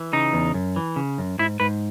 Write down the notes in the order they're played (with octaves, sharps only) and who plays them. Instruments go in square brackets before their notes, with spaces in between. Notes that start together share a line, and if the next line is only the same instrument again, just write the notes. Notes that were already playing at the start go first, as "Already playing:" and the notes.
Already playing: [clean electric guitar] E3
C#3 D#4
E2
F#2
E3
C#3
F#2
G#2 E4
G#2 B4